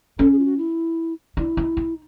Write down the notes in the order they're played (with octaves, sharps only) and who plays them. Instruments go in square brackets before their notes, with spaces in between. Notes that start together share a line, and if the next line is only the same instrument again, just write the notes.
[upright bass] C#4 [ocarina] A4
[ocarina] G#4
F4
F#4
E4
[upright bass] D4 [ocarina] E4
[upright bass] D#4
D#4